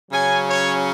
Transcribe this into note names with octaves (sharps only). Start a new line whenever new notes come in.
C#3 F#3 C#4 G#5
C#5